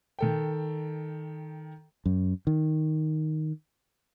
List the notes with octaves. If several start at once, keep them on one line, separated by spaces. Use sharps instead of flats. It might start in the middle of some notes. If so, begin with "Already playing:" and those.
D#3 A4 G5
F#2
D#3